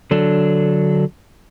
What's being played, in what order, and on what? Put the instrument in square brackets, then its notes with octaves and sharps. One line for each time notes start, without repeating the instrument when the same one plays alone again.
[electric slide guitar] D3 F#3 D4 A4